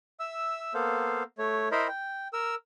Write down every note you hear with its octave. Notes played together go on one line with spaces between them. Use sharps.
E5 E6
A#3 B3 A4 C5 F5
A3 C#5
E4 A#4 C5 D#5 B5
G5
A#4 E6